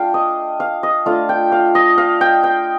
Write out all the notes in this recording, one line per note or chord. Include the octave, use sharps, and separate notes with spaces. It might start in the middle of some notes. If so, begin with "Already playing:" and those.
Already playing: A3 D4 F4 F5 G5
D#5
F5
D#5
A3 D4 F4 F5
G5
F5
D#5
F5
G5
G5